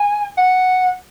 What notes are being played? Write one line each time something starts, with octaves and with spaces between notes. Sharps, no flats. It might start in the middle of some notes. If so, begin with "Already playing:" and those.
Already playing: G#5
F#5